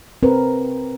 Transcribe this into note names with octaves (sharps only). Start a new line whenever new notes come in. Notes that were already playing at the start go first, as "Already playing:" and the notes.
C4 A#4 B4